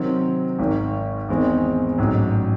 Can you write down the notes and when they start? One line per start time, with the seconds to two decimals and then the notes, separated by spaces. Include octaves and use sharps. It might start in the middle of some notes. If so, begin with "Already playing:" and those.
Already playing: C3 D#3 F#3 C4
0.59 G#1 G#2 D#3
1.29 E2 D#3 G#3 C4
1.98 A1 G#2 F#3